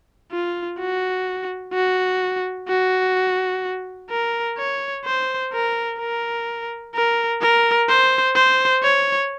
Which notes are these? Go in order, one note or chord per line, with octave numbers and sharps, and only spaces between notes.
F4
F#4
F#4
F#4
A#4
C#5
C5
A#4
A#4
A#4
A#4
C5
C5
C#5